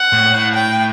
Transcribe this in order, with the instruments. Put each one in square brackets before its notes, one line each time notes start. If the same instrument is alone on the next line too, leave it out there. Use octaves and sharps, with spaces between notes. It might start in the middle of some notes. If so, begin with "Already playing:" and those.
Already playing: [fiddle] F#5
[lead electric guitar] A2
A2
[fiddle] G5